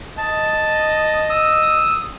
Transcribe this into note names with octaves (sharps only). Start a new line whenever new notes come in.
D#5 A5
D#6 E6